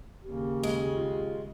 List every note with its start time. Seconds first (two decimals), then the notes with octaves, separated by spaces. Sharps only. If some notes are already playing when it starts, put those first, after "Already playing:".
0.25 D#2 C#3 A#3 G4
0.63 G#3
0.94 F4